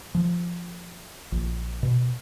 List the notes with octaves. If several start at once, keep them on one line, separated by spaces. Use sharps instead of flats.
F3
A#1
B2